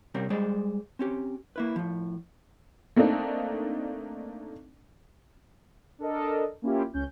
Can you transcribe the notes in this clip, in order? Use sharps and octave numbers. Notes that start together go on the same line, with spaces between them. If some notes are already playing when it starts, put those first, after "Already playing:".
C3 G3 C4 C#4 A#4
G3 G#3 G#4 C5 D5
C4 C#4 G4
A#3 E4 B4
A2 F3
A3 A#3 C4 D4 D#4
D4 A4 A#4 D#5
A#3 C#4 E4 F4 G4
C#2 C#4 G6